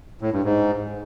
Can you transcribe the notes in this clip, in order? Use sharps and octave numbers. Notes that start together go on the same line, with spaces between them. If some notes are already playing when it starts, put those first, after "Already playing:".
A2
G2
G#2